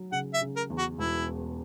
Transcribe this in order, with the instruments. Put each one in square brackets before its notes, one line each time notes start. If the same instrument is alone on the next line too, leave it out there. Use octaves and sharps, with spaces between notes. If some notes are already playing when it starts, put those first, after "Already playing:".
Already playing: [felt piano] F#3
[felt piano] C#3 [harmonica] F#5
[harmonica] E5
[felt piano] C#3
[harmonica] A#4
[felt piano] E2
[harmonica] F#4
[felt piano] E1 [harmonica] E4